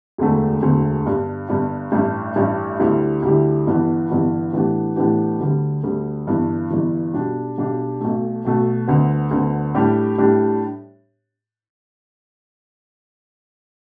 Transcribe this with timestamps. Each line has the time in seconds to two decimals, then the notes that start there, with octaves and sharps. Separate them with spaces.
0.18 E1 D2 D3 A3
0.62 E1 D2 D3 A3
1.05 G1 G2 G3
1.48 G1 G2 G3
1.92 A1 G2 G3
2.36 A1 G2 G3
2.79 D2 D3 G3 E4 G4
3.22 D2 D3 G3 E4 G4
3.67 G1 G2 E3 B3
4.10 G1 G2 E3 B3
4.53 A2 E3 B3 D4 G4
4.96 A2 E3 B3 D4 G4
5.40 D2 D3 G3
5.83 D2 D3 G3
6.27 G1 G2 E3
6.70 G1 G2 E3
7.13 B1 B2 G3 D4 G4
7.58 B1 B2 G3 D4 G4
8.01 B1 B2 A3
8.45 B1 B2 A3
8.88 D2 D3 B3
9.31 D2 D3 B3
9.74 A2 G3 D4 G4
10.18 A2 G3 D4 G4